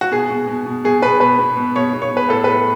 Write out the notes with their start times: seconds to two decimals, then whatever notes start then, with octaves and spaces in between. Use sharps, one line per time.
0.01 F#4
0.11 B2 G#4
0.30 B2
0.48 B2
0.66 B2
0.84 B2 G#4
1.02 B2 B4
1.20 B2 B4
1.39 B2
1.57 B2
1.75 B2 C#5
1.93 B2
2.02 C#5
2.11 B2
2.17 B4
2.29 A2 A4
2.44 A2 B4